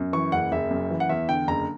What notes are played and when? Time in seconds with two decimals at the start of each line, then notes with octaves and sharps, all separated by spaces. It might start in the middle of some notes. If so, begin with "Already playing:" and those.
Already playing: F#2
0.13 E3 C#6
0.32 F#1 F#5
0.52 F#1 E5
0.71 F#2
0.90 E3
1.00 F#5
1.09 E2 E5
1.29 D3 G5
1.48 F#1 A#5